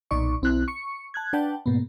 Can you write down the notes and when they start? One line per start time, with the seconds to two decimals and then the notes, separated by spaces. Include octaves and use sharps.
0.11 B1 A#2 D#4 D5 C#6
0.42 B1 C4 E4 F#6
0.68 C#6 C#7
1.14 A5 F#6 G#6
1.33 D4 B4 D5 F#5 G5 A5
1.66 G#2 B2 A#3 B3